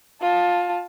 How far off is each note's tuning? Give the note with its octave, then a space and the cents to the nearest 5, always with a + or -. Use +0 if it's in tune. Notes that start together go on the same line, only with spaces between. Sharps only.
F4 +15 A5 -5